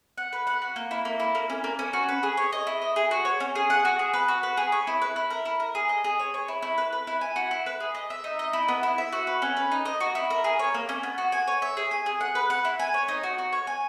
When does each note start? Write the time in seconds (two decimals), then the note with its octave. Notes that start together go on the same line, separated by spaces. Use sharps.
0.17 F#5
0.33 B4
0.47 F#5
0.62 F#4
0.76 A#3
0.91 E4
1.05 A#3
1.20 E4
1.35 A#3
1.50 C#4
1.64 A#3
1.79 C#4
1.93 F#4
2.09 B4
2.23 G#4
2.37 C#5
2.52 D#5
2.67 E4
2.82 D#5
2.96 G#4
3.11 F#4
3.25 C#5
3.40 C#4
3.55 G#4
3.70 F#5
3.85 F#4
3.99 G#4
4.13 B4
4.28 F#4
4.43 B4
4.57 G#4
4.72 C#5
4.87 E4
5.02 B4
5.16 E4
5.30 A#4
5.45 E4
5.60 A#4
5.75 G#4
5.89 D#5
6.04 G#4
6.19 C#5
6.34 C#5
6.48 E4
6.62 E4
6.78 B4
6.93 B4
7.07 E4
7.21 G#5
7.36 F#4
7.51 E4
7.66 B4
7.80 G#4
7.95 D#5
8.10 E5
8.24 D#4
8.39 D#5
8.53 E4
8.68 B3
8.83 E4
8.98 E5
9.12 F#4
9.27 B4
9.42 C#4
9.57 B4
9.72 D#4
9.85 D#5
10.00 F#4
10.15 E4
10.30 A#4
10.44 G#4
10.59 C#5
10.74 A#3
10.89 C#4
11.03 B3
11.18 F#4
11.32 G#5
11.47 C#5
11.62 E5
11.77 G#4
11.91 G#5
12.06 G#4
12.21 F#5
12.35 B4
12.50 F#5
12.65 E4
12.79 G#5
12.94 C#5
13.08 D#4
13.23 F#4
13.38 F#4
13.53 C#5
13.67 G#5